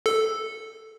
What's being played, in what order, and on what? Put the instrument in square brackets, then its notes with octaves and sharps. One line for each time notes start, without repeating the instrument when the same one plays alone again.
[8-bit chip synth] A4